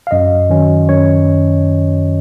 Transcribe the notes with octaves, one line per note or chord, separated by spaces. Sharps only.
F5
F#2 D#5
D#3 F#3 C#4
F#2 C#5